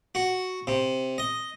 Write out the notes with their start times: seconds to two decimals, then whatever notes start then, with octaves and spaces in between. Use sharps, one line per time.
0.15 F#4
0.67 C3
1.18 D#5